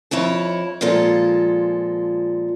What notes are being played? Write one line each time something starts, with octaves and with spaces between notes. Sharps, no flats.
F2 E4 C#5 A5
A#2 F3 G#3 F4 A4